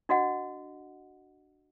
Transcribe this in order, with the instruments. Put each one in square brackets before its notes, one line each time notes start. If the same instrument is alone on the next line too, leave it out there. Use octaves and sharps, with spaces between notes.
[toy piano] D4 F#4 D#5 F#5